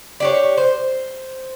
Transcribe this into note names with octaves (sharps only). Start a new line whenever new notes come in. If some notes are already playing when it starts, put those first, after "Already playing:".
D4 G4 C#5
C5